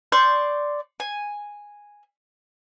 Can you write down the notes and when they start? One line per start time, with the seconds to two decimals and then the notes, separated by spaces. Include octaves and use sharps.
0.12 D5 C6 C#6 G6
1.00 G#5